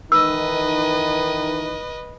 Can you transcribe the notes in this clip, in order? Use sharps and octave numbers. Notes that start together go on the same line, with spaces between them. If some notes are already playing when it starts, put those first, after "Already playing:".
D#3 E3 D#4 B4 D#5 E6